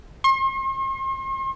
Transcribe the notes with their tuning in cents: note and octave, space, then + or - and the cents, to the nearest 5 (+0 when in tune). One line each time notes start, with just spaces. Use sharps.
C6 +45